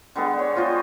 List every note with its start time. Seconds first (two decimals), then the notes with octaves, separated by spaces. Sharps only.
0.16 D3 G3 G#3 B3
0.39 C#5
0.55 F3 F4 F#4 C5